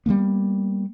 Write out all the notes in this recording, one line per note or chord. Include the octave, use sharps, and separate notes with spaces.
G3 G#3 A#3 B3